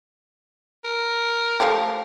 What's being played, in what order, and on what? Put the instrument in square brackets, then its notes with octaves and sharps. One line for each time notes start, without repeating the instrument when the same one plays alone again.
[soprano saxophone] A#4
[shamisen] F3 A3 G4